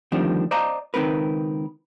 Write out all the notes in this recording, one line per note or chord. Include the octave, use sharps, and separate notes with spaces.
D2 D#3 F3 G3 C4 D4
C5 D5 D#5 F5 A5 A#5
C#2 D#3 F3 C4 A#4 B4